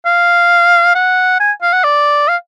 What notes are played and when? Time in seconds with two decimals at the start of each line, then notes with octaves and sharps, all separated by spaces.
0.06 F5
0.95 F#5
1.40 G#5
1.62 F5
1.73 F#5
1.84 D5
2.28 F5